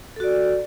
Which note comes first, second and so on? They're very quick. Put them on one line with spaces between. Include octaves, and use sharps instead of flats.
A4 F#4 D5